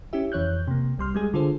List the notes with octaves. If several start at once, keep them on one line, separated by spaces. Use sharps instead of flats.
C#4 E4 G4 E5
F2 E3 C#5 F#6 G6
C3 A#3
C2 G3 C6 F6
G3 G#3 G#4
D3 F4 G#4 A4 C5